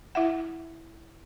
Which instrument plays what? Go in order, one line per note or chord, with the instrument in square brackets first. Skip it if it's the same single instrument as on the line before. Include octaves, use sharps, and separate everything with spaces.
[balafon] E4 E5 F#5